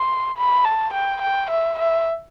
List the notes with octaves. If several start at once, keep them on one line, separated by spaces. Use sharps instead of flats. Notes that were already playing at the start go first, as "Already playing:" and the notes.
Already playing: C6
B5
A5
G5
G5
E5
E5